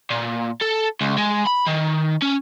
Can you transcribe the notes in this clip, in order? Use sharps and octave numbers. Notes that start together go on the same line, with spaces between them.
A#2
A4
C#2
G#3
B5
D#3
C#4